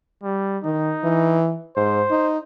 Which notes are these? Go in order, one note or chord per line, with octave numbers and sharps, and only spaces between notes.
G3
D#3 D#4
E3
G#2 C5
D#4